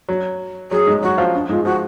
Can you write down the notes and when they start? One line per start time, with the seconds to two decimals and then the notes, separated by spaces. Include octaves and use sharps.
0.09 F#3
0.71 F#3 G#4
0.87 G#2 G#3
1.02 F#3 F#4
1.18 F3 F4
1.34 D4
1.49 G#2 G#3 F4
1.65 F3 F#4